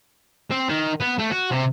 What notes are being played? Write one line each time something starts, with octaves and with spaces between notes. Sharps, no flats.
C4
D#3
B3
A3
F#4
C3